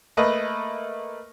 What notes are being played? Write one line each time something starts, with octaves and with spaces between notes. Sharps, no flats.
A3 A#3 B4 D#5